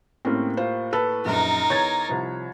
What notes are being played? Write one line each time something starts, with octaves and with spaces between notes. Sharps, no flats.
A2 A#3 C4 C#4 G4
F4 C5
A4 B4
A#1 F#2 D#4 A#4
E2 C#5 G#6 A6
C2 F3